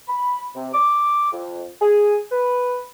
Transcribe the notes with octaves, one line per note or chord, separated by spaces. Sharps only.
B5
C3
D6
F2
G#4
B4